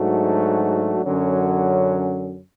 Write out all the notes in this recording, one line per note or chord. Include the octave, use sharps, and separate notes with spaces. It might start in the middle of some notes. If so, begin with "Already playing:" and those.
Already playing: G#2 F#3 A3 D4 F#4
F#2 D3 F#3 C#4